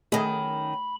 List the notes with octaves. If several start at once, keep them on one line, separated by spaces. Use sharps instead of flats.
F#2 D#3 A3 G#4 D#5 B5